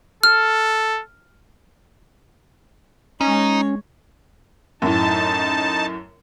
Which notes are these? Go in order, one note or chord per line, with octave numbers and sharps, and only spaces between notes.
A4 F6
G#3 C#4 D#4 C#5
F#2 A2 D#4 A5